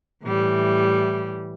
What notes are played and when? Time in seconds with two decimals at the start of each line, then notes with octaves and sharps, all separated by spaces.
0.24 A2 E3 G3